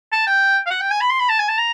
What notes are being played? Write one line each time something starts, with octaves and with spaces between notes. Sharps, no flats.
A5
G5
F5
F#5
G5
G#5
B5
C6
B5
A5
G#5
A5
A#5